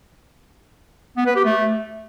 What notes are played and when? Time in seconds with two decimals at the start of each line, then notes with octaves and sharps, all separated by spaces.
1.17 B3
1.26 B4
1.35 G4
1.45 A3